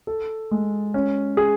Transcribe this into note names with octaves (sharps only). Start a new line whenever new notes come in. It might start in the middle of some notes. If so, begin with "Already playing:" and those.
A4
G#3
C#4
G#4